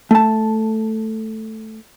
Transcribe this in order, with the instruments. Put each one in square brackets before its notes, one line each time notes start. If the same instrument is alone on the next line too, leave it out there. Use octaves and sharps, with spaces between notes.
[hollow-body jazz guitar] A3 A5